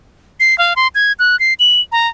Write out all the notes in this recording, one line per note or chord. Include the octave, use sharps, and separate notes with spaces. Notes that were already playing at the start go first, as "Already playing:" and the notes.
C7
F5
C6
G#6
F#6
C7
F#7
A#5